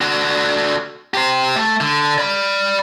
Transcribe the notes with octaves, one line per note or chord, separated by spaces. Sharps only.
D3 F#4
G4 C5
A3
D3
D5 B5